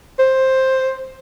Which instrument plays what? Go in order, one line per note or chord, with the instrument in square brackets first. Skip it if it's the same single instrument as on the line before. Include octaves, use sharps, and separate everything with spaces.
[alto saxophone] C5